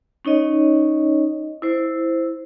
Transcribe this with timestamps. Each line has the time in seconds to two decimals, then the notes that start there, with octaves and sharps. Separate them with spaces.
0.25 C#4 D#4 C#5 D#5
1.62 E4 C5